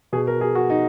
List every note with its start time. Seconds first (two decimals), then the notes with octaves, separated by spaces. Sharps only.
0.13 B2 G#4
0.27 A#4
0.41 G#4
0.55 F#4
0.70 D#4